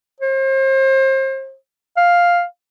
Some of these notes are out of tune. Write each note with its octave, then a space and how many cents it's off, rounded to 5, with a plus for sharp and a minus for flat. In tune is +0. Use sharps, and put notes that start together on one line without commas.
C5 +35
F5 +5